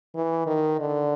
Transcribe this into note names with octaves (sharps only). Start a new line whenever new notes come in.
E3
D#3
D3